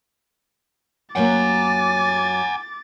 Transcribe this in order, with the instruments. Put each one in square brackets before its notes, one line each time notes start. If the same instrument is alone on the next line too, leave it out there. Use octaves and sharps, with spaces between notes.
[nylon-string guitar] F#2 F#3 A#3 [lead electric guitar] F#5 G#5 [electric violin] D6 A6